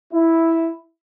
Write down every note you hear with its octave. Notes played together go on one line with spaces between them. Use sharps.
E4